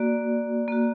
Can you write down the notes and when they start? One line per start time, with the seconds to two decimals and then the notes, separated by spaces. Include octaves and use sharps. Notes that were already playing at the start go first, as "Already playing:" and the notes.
Already playing: A#3 F#4 D5
0.68 A#3 F#4